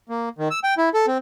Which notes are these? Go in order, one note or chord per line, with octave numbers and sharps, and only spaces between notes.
A#3
D#3
E6
G5
E4
A4
C4